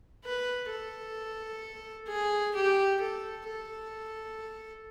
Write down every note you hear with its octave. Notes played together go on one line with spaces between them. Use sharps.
B4
A4
G#4
G4
A4
A4